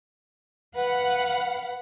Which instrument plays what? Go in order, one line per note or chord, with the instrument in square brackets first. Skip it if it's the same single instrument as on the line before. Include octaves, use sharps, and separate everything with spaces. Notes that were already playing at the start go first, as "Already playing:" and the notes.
[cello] B4 F5 [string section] F#5